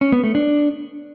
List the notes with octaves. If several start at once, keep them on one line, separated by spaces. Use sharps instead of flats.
C#4
B3
A3
D4